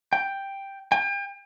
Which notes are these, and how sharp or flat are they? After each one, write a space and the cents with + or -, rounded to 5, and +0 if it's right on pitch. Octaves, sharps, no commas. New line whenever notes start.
G5 +5
G5 +40